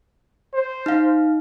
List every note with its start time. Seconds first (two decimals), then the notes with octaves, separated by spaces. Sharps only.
0.54 C5
0.86 D#4 F5